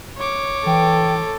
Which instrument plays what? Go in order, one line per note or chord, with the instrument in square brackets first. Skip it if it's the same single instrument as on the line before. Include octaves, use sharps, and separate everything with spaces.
[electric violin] C#5 D6
[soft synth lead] E3 [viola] A4 [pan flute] G5